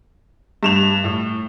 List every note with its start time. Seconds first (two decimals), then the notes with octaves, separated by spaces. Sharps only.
0.63 G2 E7 F7
1.04 A2